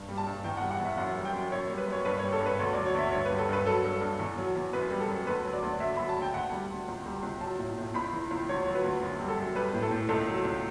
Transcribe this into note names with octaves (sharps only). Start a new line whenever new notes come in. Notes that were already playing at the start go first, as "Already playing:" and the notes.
Already playing: G2
G3
A5
G2
E2 G5
F#5
G3
F#5
E2 E5
F#2 F#5
G3
G5
F#2
F#2 C#5
G3
B4
F#2
C#5
G2 B4
C#5
G3
A4
G2
B4
D2 C#5
D5
F#3
C#5
D2 E5
G2 C#5
B4
G3
A4
G2 B4
F#3 A4
G2
G2
E2
F#3
E2
F#2 B4
G3
A4
F#2
D2 B4
F#3
D5
D2
D2 E5
F#3 B5
A5
D2
G5
D2 F#5
G3
D2
C#2
G3
C#2
F#3 A5
A2
A2
C#2 B5
E3
C#2
D2 C#5
F#3
B4
D2
F#2
G3
A4
F#2
G3 B4
A2
A4
A2
C#2 A4
F#3
C#2